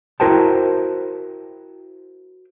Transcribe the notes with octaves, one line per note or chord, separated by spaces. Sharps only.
E4 F#4 A#4 C5 G5 A5